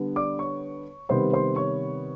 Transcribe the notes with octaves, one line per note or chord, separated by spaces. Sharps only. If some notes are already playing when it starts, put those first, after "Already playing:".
Already playing: D3 G3 B3
D5 D6
C#5 C#6
C3 D#3 G3 B3 C5 C6
C5 C6
C#5 C#6